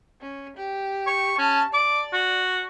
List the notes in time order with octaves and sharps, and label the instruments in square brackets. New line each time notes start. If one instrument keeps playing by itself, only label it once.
[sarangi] C#4
G4
[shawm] C#6
[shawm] C#4 [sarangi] A5
[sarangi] D5 [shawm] D6
[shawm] F#4